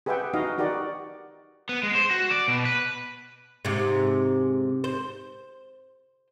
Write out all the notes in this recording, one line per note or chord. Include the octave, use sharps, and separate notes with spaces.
G4 G#4 B4 E5 F#5 G5
D#4 F#4 D#5 F5
D#4 F#4 G4 A#4 D5
B3
G#3
C5
F#4
D5
B2
B4
G#2 C3
C5